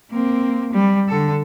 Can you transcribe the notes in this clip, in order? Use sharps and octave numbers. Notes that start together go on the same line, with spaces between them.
A#3 C4
G3
D3 A4